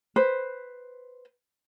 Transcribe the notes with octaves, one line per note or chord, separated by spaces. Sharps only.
B4 C5